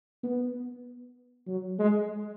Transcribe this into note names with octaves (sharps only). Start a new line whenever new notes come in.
B3
F#3
G#3